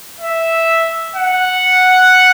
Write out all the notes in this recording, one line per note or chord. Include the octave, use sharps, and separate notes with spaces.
E5
F#5